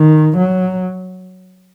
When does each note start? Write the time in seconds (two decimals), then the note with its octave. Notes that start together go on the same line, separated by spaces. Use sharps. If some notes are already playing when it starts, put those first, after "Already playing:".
Already playing: D#3
0.37 F#3